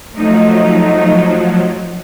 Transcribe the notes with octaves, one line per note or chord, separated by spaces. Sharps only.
F3 F#3 A3 D#4